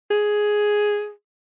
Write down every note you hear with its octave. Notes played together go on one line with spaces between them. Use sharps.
G#4